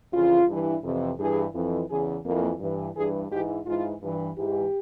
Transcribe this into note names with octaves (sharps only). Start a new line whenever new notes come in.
F2 C#3 E3 F4
G2 E3
F2 C3 E3
G2 E3 G#4
F2 E3
E2 C#3 E3 G#4
F2 E3 A#3
G2 E3
G2 E3 G#4
G#2 E3 G4
G#2 E3 F4
G2 E3
G#2 E3 G4